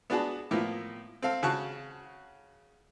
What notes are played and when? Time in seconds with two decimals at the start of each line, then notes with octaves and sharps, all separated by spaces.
0.10 B3 D4 F#4 G#4 A5
0.51 A2 F3 A#3 B3
1.22 C4 A4 F5
1.43 C#3 F#4 A5 C#6 F#6